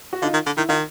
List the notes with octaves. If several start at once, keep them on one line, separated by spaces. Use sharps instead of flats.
F#4
D3 D#4 F4
D#3
D3
D#3 E4
D#3 D#4 F4